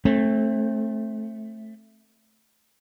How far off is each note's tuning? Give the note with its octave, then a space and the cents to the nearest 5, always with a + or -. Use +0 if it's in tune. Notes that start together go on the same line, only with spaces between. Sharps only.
A3 +0 C4 +35